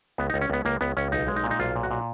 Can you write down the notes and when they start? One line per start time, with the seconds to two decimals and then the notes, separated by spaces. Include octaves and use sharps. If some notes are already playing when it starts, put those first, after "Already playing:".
0.18 C#2 B3
0.30 D#4
0.34 C#2
0.41 C#4
0.50 C#2 B3
0.65 C#2 A#3
0.81 C#2 B3
0.97 C#2 C#4
1.12 B1 D#4
1.28 G#3
1.36 D#4
1.44 A#2
1.51 D#4
1.59 B1 F4
1.76 A#2
1.83 F#4
1.91 A#2